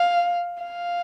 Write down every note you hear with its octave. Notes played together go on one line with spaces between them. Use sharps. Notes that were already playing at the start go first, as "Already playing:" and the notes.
Already playing: F5
F5